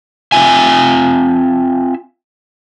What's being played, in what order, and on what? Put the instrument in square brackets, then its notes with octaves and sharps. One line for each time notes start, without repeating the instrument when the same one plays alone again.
[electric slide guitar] C4 F4 E5 G#5